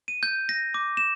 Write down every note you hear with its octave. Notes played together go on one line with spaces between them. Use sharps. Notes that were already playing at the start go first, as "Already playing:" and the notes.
D#7
G6
A#6
D6
E7